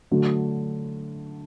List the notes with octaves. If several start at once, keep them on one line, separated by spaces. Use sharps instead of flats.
D3 F#3 A3